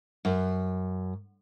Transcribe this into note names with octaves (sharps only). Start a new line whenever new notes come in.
F#2